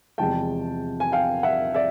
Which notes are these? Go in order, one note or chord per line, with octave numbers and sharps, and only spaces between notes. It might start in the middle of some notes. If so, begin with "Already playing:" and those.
E2 C3 F3 G#3 G5 A5
G#5
F5 G5
E5 F#5
D5 E5